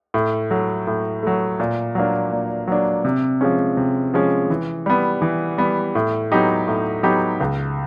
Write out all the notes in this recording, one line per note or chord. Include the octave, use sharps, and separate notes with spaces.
A2
F#3 A3
A2
F#3 A3
A#2
F#3 A#3 D4
A#2
F#3 A#3 D4
C3
F3 G#3 C#4
C3
F3 G#3 C#4
E3
G3 B3
E3
G3 B3
A2
F#3 B3 D#4 G4
A2
F#3 B3 D#4 G4
C#2